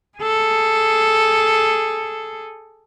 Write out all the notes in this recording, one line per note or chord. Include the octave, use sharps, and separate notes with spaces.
G#4 A4